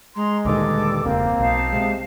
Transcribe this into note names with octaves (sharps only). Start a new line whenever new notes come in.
G#3 A#5 C6
D2 G2 A#2 D#3 A4 D6
E1 C#2 A#3 C4
B1 D#4 F5 A5
C3 G#3